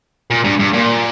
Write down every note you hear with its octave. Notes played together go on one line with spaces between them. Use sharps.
A#2
G2
G2
A#2